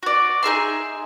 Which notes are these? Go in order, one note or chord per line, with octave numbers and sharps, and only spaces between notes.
F#4 D5
D#4 G#4 E5 C6